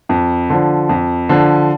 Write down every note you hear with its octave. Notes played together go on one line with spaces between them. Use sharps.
F2
D3 F3
F2
D3 F3